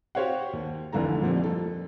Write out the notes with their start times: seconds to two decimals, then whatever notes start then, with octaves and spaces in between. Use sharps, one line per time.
0.15 F#4 G4 C5 C#5 F5 F#5
0.53 D#2
0.93 F1 C2 D3 E3 A4 A#5
1.22 F2 A#2 F3 G3 C4
1.39 F2 A4